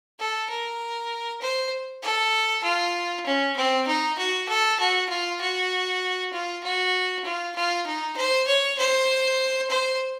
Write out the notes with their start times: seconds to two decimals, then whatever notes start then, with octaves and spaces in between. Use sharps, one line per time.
0.19 A4
0.50 A#4
1.41 C5
2.02 A4
2.63 F4
3.26 C#4
3.56 C4
3.87 D#4
4.18 F#4
4.48 A4
4.79 F#4
5.09 F4
5.41 F#4
6.32 F4
6.63 F#4
7.24 F4
7.55 F4
7.86 D#4
8.16 C5
8.47 C#5
8.78 C5
9.70 C5